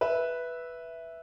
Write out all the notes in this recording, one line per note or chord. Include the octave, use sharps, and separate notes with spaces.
B4 E5